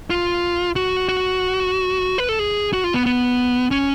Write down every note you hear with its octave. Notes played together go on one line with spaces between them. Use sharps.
F4
F#4
F#4
B4
A4
G#4
F#4
F4
B3
B3
C#4